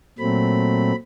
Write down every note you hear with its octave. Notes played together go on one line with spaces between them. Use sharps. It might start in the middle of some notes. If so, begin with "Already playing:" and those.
A#2 F#3 A3 C4 B5